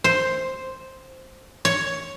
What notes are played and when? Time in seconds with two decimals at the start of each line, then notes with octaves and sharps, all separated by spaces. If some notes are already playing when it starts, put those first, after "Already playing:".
0.04 C5
1.65 C#5